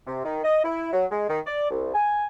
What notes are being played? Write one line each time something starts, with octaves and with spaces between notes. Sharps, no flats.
C3
D#3
D#5
E4
F#3
G#3
D#3
D5
C2
G#5